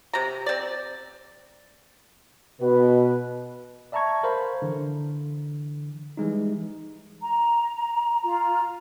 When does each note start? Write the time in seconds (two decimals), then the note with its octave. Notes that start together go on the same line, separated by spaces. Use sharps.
0.13 C3 A#5
0.46 C4 D5
2.60 B2 B4
3.92 D5 E5 A5 A#5 C#6 G#6
4.23 A#4 C5 F5 B5
4.62 D3 E3
6.17 E3 G3 G#3 D#4
7.22 A#5
8.22 F4 A#5